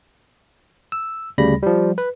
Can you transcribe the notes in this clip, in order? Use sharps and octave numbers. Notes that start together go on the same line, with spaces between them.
E6
D2 C#3 G3 B5 A#6
F3 G3
B4